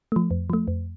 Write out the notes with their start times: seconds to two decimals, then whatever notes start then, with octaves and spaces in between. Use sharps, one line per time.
0.12 F3 A3
0.31 F2
0.50 F3 A3
0.68 F2